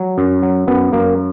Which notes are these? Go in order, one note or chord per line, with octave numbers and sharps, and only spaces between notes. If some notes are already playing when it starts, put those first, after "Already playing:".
Already playing: F#3
F#2
F#3
F#2 B3
F#2 A#3